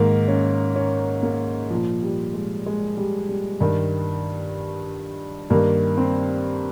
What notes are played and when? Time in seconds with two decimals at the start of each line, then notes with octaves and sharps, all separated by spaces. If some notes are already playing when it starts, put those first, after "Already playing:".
Already playing: G#2 D#3 A#3
0.28 C#4
0.76 C#4
1.23 A#3
1.70 A#2 F3
2.02 G3
2.34 G#3
2.66 G#3
2.97 G3
3.29 G3
3.61 G2 D#3
5.50 G2 D#3 A#3
5.98 C4